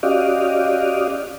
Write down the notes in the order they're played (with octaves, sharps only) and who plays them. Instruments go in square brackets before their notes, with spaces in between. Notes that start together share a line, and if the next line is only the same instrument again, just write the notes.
[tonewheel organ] C#4 F#4 G4 D5 D#5 F5